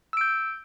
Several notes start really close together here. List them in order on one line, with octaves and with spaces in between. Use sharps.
E6 D7 G6